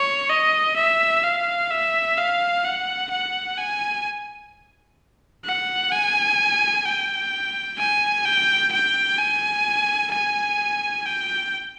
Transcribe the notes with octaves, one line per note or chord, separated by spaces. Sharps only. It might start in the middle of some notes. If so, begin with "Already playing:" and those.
Already playing: C#5
D#5
E5
F5
E5
F5
F#5
F#5
G#5
F#5
G#5
G5
G#5
G5
G5
G#5
G#5
G5